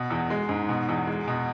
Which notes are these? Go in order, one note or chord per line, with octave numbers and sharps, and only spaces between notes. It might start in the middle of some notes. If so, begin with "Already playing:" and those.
Already playing: B2
E2
G#3
G#2
B2
E2
G#3
B2